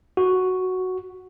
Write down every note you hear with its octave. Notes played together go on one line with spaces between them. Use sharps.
F#4